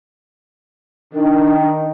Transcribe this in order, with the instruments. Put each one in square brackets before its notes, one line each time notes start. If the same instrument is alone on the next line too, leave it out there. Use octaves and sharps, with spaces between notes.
[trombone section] D#3 [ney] D4